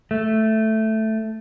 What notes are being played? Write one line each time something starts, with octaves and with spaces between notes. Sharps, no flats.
A3